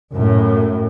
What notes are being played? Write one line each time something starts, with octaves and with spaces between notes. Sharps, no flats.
F#2 A2